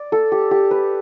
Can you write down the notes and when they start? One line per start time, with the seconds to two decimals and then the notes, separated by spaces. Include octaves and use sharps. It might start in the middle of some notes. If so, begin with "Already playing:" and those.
Already playing: D5
0.12 A4
0.32 G4
0.51 G4
0.71 B4